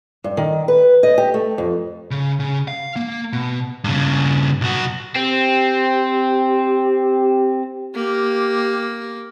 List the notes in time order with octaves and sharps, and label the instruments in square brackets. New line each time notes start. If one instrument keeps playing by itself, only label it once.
[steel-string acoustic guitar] G2
D#3
B4
D#5
G4
A3
F2
[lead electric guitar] C#3
C#3
F5
A#3
B2
G2 C#3
B1 F#4
[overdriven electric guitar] C4 [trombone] G4
[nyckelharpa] A#3 [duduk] G4